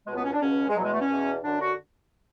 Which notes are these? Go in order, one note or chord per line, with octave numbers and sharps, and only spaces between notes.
C#2 B2 G#3
B3
C#4
D4
C#2 B2 C#4
G#3
E2 B2 F#3 G#3
A3
C#4
E2 B2
F#2 D3 D4
F#4